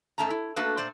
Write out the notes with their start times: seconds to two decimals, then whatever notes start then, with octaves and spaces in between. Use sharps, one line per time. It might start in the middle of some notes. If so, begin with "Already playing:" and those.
0.18 G#2 A3 C#4 A5 A#5
0.30 E4
0.56 A3 A#3 D4 F#4 A4 B4
0.77 A#2 A3 C5 D5